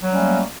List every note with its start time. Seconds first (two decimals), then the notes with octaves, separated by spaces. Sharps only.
0.03 F#3
0.07 G3
0.11 C#4
0.16 A3
0.20 A#3